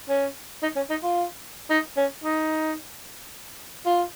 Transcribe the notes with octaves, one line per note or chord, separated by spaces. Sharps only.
C#4
D#4
C#4
D#4
F4
D#4
C#4
D#4
F4